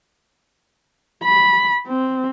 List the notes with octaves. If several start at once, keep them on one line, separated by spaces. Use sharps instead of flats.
B5
C4